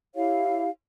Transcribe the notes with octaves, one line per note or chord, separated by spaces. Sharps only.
E4 G4 C#5 F5